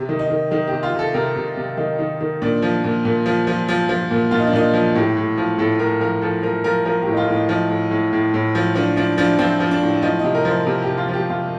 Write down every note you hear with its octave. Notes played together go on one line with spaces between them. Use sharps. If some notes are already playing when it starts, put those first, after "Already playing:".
Already playing: C3
D#3
D#4
D#3
D#3 D#4
G4
C3
F4
C3
A4
C3 A#4
C3
C3
D#3 D#4
D#3
D#3
A#2 D4
F3
A#2
A#2
F3
F3
F3
F3
A#2
A#2 F4
D#4
D4
A#2 D#4
F3
A2 G4
A2
F3
A2 A4
A2 A#4
F3 A#4
F3 A4
F3 A#4
F3 A#4
F3 A#4
G4
A2
D#4
F4
A2 D#4
F3 D#4
A2
A2
A2
A2
F3
F3 D4
F3 D4
F3 D4
F3 C4
F3
D4
A2
F3 D#4
D#4
C3
A#4
F3
C5
C3 A#4
G4
C3
F4
F3
G4
C3 F4